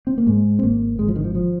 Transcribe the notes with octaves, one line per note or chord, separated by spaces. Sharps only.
C4
A#3
G#2 G#3
C4
G#1 A#3
G#1 G#3
F3
D#3
F3
F3